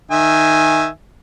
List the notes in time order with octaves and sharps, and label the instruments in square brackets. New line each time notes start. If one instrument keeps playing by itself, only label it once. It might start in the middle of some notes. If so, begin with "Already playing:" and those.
[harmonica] D#3 E5 G#5